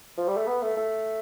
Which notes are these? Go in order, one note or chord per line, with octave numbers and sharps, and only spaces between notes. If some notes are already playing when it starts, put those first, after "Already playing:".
F3
G3
A3
B3
A3
A3